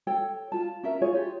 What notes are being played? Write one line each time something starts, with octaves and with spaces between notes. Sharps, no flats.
A4 C#5 G5
F4 A5
C#4 A#4 E5
F4 G#4 C#5
F4 G4